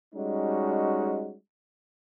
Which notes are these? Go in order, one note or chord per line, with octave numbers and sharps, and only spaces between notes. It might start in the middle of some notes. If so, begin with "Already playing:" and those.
G3 G#3 C#4 D#4 F#4